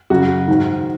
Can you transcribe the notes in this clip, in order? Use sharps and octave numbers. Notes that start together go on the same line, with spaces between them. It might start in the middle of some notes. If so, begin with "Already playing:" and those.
F#2 C#3 F#4
G#2 D#3